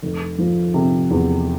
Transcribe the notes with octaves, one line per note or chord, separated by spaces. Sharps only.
F1
F3
C3
E2